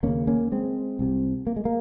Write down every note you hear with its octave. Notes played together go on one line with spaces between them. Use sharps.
D#2 C#3 A#3 C#4
A#3 C#4
G#3 C4
C2 C3
A#3
G#3
A#3